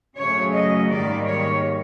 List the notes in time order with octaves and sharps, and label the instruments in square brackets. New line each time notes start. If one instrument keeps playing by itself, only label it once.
[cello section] F#2 C#3 F#3 A3 C#5
D#5
G#2 D#3 G3 A#3 D5
C#5